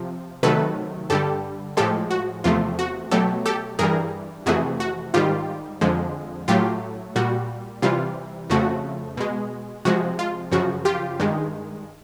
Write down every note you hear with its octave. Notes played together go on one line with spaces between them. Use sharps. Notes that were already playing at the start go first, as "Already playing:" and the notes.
Already playing: C3 F3
C3 D#3 F#3 A3 A4 B4
G2 D3 G3 G4 A4
A2 F3 G#3 G4 A4
F#4
E2 C3 F3 A3 F4
F#4
B2 F#3 A3 G4 A4
G4 A4
G2 E3 G3 G#4 A#4
F2 C3 E3 A3 F#4 G#4
F#4
G#2 D#3 G3 F4 G4
F2 D3 F3 G#3
A2 F#3 A3 F4 G4
A#2 G3 F#4
C3 E3 G3 F4
F2 C#3 F3 A3 F#4
B2 G#3
C3 F3 G#3 F#4
F4
F#2 C#3 F3 F#4
F4 G4
G2 D#3 G#3